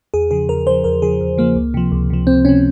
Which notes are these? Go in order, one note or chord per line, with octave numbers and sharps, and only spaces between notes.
E2 G#4
C#3 F3 G#4
E2 A#4
C#3 F3 C5
E2 A#4
C#3 F3 G#4
E2
C#3 F3 A#3
C#2
C3 F3
C#2
C3 F3
C#2 C4
C3 F3 C#4